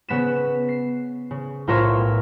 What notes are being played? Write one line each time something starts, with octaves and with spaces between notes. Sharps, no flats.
C#3 B3 B6 E7
C7
C#3
B1 A2 F4 A#4 C#5 E5